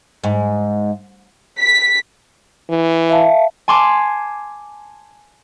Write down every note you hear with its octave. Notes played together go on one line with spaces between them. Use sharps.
G#2
B6
E3
E5 F5 A5
G#5 A5 C6 D6